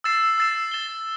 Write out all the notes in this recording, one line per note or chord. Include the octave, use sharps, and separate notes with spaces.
E6 A6 C7 E7
E6 A6 C7 E7
A6 E7 G7